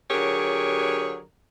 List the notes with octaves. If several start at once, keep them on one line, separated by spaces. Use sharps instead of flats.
D3 F#3 G4 G#4 A#4 C#5